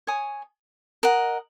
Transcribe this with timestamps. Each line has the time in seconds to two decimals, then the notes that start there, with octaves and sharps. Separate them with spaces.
0.07 C#5 G#5 D#6
1.03 A#4 D#5 F#5